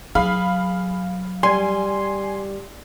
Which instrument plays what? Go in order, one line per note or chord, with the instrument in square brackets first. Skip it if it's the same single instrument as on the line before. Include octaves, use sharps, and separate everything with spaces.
[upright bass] F#3 [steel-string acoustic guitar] G#4 [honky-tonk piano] F5 B5
[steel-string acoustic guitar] G3 [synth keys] G#5 C6